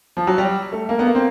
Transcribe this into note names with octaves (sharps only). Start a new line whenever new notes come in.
F3
F#3
G3
A3
A#3
B3
A#3
C4